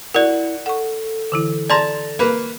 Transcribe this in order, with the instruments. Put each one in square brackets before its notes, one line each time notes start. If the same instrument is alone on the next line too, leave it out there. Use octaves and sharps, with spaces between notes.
[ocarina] E4 [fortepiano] F#4 [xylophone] A#4 D5
[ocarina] A4 [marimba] F#5 C#6
[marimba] D3 E3 E4
[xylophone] D5 C6 [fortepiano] A5 A#5
[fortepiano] A#3 B4